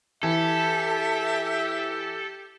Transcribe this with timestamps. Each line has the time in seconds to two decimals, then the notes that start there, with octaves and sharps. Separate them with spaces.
0.23 E3 G4 A4 E5